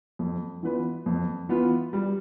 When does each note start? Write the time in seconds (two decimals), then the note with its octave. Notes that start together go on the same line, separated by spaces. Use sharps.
0.19 F2
0.63 E3 B3 F4 B4
1.06 F2
1.49 E3 B3 F4 B4
1.93 G3